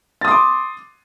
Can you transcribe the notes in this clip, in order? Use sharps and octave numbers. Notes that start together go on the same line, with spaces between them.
C6 D6 D#6 A6